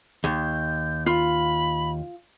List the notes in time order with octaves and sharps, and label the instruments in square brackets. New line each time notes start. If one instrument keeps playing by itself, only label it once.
[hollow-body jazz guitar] D#2 [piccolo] G6
[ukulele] F4 [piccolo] B5